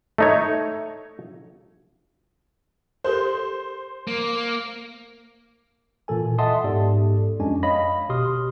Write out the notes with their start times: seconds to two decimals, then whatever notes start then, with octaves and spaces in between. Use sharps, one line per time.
0.18 A3 D#4 C#5
3.04 G4 A4 A#4 C5
4.08 A#3
6.08 A#2 E3 A4 G#5
6.38 D#5 E5 F#5 A5 C6 D#6
6.64 G#2 B3 G4 A4 D5
7.40 F2 G#3 C#4 D4 G#5
7.63 C#5 D#5 F5 B5 A#6
8.09 G1 B2 G4 C6 D#6 F6